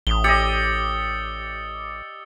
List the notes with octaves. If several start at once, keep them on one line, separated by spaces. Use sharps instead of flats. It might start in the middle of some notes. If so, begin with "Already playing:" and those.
A1 D#6 G7
G4 D5 D#5 E6 A6 C#7